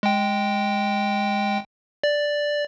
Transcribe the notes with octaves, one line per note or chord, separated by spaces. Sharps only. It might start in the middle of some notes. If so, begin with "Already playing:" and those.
G#3 G5
D5